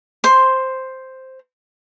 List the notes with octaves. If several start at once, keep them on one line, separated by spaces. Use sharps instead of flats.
C5 C6